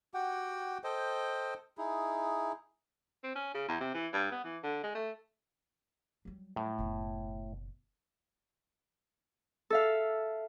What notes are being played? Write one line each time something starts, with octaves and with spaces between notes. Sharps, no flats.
F#4 G4 F#5 G5
A4 C5 D#5 G5
D#4 E4 G#4
C4
C#4
C#3
E2
C3
E3
G2
B3
E3
D3
G#3
A3
F#3 G3
A2
F#1 B2
A4 E5 F5